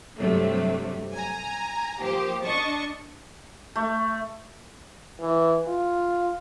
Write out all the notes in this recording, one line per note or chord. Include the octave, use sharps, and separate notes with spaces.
G2 C3 F#3 A3
G#5 A#5
F3 A#3 G4 C5
D4 D#5 A5 C#6
A3
E3
F4